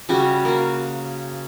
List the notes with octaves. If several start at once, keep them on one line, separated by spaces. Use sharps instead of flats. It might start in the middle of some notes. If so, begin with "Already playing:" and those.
C#3 G3 F#4
A#3 F#4